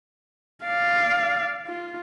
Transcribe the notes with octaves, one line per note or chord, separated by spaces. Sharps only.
D5 F5
F4